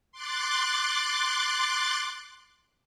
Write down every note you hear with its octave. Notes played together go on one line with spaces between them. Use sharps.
C6 D6 F#6 A6